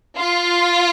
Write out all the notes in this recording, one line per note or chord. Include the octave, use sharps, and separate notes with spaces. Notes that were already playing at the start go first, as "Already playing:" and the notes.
F4